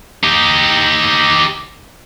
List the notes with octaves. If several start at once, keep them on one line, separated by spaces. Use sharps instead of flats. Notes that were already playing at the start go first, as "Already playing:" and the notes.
D#4 G4